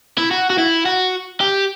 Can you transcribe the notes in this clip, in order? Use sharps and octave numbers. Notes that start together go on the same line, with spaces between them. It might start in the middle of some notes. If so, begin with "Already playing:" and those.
E4
F#4
F#4
E4
F#4
G4